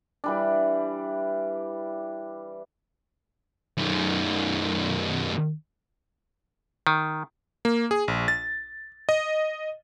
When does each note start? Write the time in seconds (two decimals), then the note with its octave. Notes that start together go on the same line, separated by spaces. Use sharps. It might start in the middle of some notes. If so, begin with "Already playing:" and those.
0.24 E3 G3 D4
3.77 F#2 D#3
6.87 D#3
7.65 A#3
7.91 G#4
8.08 A#1
8.28 A6
9.09 D#5